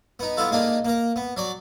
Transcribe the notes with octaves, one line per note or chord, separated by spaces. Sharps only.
B3 D#4
B3 E4 F4 A4
G#3 A#3 D4 D#4
A#3 A#4
B3
F#3 D5